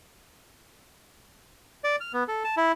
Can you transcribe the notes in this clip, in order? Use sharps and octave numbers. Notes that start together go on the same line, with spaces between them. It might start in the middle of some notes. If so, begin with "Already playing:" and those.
D5
F6
B3
A4
A5
E4